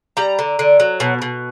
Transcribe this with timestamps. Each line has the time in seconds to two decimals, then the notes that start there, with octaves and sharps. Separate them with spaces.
0.17 G3 A#5
0.39 D3
0.59 D3
0.80 F#3
1.00 B2
1.22 B2